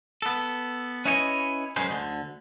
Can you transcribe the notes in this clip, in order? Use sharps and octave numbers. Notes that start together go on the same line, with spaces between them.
B3 A4
C#4 E4 B4 C#5 D#5 G#5
F#2 F#3 G#3 C#4 B4 C5
D2 D3